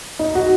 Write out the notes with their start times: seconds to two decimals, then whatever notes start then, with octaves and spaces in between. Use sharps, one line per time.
0.19 D#4
0.35 F#4